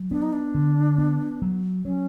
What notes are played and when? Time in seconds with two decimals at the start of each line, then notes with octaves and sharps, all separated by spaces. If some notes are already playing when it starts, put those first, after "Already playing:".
Already playing: F#3
0.11 B3 D4
0.22 D#4
0.33 D4
0.55 D3
0.98 B3
1.42 F#3
1.84 F#3 C#4